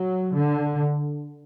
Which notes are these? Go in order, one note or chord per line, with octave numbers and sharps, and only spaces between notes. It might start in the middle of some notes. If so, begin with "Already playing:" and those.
Already playing: F#3
D3